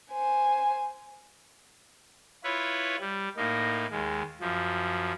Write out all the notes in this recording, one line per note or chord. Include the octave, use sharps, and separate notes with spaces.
C5 G#5
E4 F4 B4 C#5
G3
A2 A#3 D#4
D#2 G#3
F#2 F3